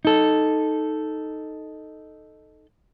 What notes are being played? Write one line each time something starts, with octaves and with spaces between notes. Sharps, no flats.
D#4 A4